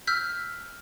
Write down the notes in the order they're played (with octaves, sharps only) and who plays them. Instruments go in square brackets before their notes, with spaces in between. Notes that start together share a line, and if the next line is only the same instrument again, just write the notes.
[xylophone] E6 F6 G6 B6